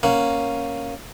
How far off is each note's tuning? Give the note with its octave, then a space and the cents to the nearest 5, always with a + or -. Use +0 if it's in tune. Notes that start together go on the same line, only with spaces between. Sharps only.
A#3 +0 C#4 +0 F#5 +0